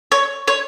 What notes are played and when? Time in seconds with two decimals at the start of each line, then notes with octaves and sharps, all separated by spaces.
0.12 C#5
0.48 C#5